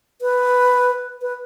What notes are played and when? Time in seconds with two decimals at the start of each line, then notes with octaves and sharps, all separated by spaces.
0.22 B4
1.22 B4